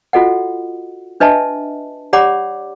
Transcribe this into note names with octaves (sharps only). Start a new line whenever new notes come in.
F4 F#4 A4 D#5 F#5
D4 B4 D#5 E5 A5
G4 C#5 D5 F#5 B5 D6